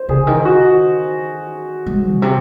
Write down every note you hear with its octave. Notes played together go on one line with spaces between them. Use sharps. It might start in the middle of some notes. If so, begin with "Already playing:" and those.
Already playing: C5
C#3 G#4
D#3
F#4
G#3
A#2
C3